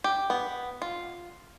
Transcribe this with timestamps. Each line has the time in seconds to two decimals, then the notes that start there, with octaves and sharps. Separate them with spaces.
0.04 G4
0.30 B3
0.82 F4